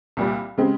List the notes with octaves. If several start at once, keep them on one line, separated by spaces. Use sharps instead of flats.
C2 A#2 G3
C#3 G#3 C4 G4